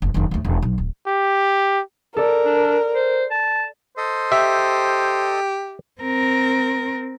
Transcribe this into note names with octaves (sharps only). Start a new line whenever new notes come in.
F#1
F1 D#3
D#2 A3
E1
B1
D1
G4
A4 A#4 D5
D4
C5
A5
A4 C5 D#5
G4 E5
C4 A#4